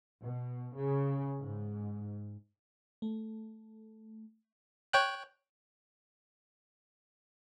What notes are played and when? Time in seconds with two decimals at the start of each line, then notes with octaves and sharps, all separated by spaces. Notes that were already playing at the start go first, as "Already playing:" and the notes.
0.23 B2
0.76 C#3
1.39 G#2
3.02 A3
4.93 C#5 G5 F#6